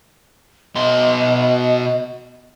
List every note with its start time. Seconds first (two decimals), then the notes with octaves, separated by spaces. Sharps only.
0.76 B2 D#5 C6